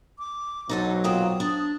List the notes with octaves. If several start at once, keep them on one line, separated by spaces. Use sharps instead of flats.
D6
B1 F#3 D#4 A4 C5
A#2 A#3 C4 D#6
D4